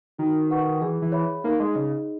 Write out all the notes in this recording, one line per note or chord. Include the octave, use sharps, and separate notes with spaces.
D#3 F#4
B4 F#5 C#6
E3 G#4
E3
C#5 E5 B5
A#3 D#4
G#3
C#3 G#4 D#5